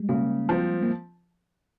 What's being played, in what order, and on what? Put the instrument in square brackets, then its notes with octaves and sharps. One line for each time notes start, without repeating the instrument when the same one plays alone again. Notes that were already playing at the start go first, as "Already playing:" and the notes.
Already playing: [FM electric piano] G3 G#3
[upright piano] C#3 [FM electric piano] A#3
[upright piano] F3 C4
[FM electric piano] A#3